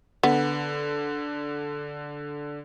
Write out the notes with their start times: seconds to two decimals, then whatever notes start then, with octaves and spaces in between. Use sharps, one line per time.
0.23 D3 B3